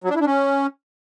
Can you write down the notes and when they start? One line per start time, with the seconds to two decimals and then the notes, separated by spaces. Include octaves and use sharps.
0.04 F#3
0.10 D4
0.15 E4
0.21 D4
0.26 C#4